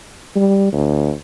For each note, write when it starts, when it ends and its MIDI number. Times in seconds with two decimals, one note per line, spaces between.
0.36 0.69 55
0.73 1.12 38